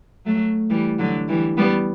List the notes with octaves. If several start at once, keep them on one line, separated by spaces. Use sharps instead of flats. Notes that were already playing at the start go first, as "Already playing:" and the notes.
F#3 A3
E3 G3
D3 F#3
E3 G3
G3 B3